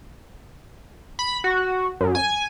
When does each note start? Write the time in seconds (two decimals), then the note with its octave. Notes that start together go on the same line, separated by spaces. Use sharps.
1.19 B5
1.44 F#4
2.01 F#2
2.15 G#5